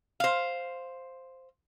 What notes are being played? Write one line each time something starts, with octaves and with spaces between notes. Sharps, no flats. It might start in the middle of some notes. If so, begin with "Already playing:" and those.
C5 F5